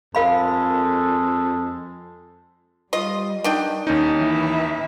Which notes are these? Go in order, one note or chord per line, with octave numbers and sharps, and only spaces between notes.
F2 G#3 A4 A#4 F5 B5
G3 F4 D#5
D#3 D4 G5
D#2 C#4 D#4
E3 E4 E5